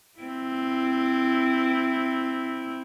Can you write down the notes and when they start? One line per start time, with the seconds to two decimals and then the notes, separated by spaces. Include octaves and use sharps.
0.19 C4 E4